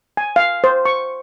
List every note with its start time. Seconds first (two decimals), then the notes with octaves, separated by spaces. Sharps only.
0.17 G#5
0.36 F5
0.64 C5
0.85 C#6